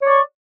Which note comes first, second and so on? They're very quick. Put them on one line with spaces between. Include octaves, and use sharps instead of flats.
C#5 D5 C#6